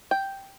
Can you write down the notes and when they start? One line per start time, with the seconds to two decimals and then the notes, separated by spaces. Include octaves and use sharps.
0.11 G5